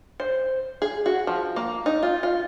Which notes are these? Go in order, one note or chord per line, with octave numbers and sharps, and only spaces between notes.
C5
G#4
F#4
F3
A#3
D#4
F4
F4